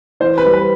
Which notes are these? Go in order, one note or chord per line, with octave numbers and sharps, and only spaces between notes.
E3 C5
B4
G3
B4